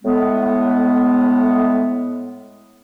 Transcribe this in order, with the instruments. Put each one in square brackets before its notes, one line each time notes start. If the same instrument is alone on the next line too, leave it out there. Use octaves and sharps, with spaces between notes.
[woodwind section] A2 G#3 B3